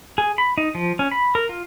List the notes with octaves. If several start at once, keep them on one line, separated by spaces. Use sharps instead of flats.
G#4
B5
D#4
F3
C#4
B5
A#4
F4